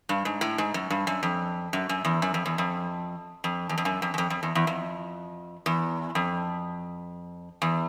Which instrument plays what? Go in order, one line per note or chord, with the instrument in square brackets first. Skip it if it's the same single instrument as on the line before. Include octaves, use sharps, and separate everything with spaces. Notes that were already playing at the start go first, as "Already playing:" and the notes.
[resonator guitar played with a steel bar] G2
G#2
A2
G#2
F#2
G2
F#2
F2
F#2
F#2
E2
F#2
F2
E2
F2
F2
E2
F2
F#2
F2
E2
F2
F2
E2
E2
F2
E2
F2
E2